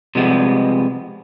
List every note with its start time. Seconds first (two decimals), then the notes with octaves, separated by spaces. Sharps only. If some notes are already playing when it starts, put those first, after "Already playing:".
0.15 C3 F3 G3 G#3 B3